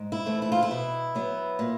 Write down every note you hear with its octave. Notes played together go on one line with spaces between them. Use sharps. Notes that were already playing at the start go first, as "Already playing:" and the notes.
Already playing: G#2
E4
E3 A3 C4
E4
F4
E4
B2
F#3 B3
A#2